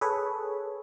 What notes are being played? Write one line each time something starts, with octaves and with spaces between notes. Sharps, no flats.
G#4 A4 B4 C#5